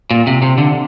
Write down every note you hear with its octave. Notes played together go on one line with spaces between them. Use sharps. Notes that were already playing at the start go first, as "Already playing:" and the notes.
A#2
C3
C3
D3